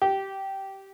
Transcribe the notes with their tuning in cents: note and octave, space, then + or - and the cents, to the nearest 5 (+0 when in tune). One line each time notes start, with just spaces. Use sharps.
G4 -15